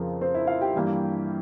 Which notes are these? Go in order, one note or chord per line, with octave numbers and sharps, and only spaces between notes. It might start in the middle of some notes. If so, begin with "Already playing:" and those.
Already playing: F2 C#3 F3 C4 A#4
C4 C5
E4 E5
F4 F5
G4 G5
G2 E3 A#3